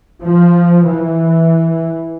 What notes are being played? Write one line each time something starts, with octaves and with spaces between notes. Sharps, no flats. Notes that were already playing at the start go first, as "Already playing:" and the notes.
F3
E3